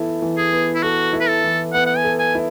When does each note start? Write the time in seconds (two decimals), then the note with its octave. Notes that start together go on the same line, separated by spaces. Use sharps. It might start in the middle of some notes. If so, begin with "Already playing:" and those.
Already playing: E3 B3 E4 A4
0.22 E3
0.38 G#4
0.53 B3
0.75 E4
0.83 F#4 A4
1.13 E4
1.21 B4
1.29 A4
1.44 E3
1.74 B3 F#5
1.87 F#5
1.97 G#5
2.04 A4
2.19 G#5
2.35 E4